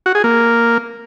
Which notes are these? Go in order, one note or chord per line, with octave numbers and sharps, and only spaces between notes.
F#4
G#4
A#3